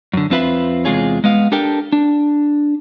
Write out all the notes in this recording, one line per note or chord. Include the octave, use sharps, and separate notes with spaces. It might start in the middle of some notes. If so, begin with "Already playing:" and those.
F#2 D3
F2 C4 F4 B4 E5 B5
E2 C3 G#3 F4 G#4 C#5
G#3 B3 F5
D4 G4 A4 A#4 G5
D4